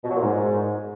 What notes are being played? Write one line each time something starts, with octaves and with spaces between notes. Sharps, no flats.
B2
F#3
A#2
G#2